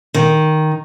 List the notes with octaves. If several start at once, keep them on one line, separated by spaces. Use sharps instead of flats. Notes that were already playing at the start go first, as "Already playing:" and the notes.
D#3